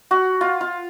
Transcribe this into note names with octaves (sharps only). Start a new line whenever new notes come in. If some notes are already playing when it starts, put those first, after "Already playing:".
F#4
F4
F4